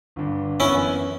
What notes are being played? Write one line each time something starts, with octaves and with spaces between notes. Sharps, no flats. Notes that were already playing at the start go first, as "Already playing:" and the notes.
G1 G2 D3
F#2 E3 B3 C#4 E4